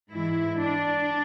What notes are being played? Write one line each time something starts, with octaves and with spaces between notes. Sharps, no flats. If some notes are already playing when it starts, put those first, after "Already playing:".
G#2 E3 E4
D4